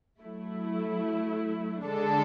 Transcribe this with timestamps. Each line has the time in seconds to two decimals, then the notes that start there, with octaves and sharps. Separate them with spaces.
0.22 F#3 A3 E4
1.87 D3 G#3 D4 A4